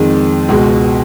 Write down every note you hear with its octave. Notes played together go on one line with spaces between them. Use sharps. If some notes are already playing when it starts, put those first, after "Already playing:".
Already playing: F2 D#3 G#3
C#2 B2 G#3